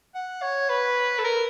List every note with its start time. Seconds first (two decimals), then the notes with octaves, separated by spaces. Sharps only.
0.15 F#5
0.42 C#5
0.69 B4
1.19 A4
1.24 A#4